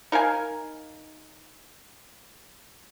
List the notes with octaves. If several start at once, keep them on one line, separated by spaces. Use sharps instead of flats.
D#4 A#4 F5 G#5